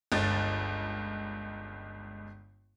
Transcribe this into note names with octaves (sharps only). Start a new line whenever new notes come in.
G1 C#2 A6